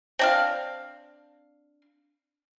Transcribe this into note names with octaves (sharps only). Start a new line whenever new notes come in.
C4 D4 F5